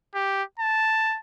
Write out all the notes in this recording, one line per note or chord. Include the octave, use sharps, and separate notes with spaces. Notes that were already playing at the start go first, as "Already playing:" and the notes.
G4
A5